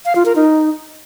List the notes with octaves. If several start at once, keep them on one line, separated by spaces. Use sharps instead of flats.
F5
F4
A#4
D#4